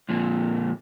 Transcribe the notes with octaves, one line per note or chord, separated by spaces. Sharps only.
F2 A#2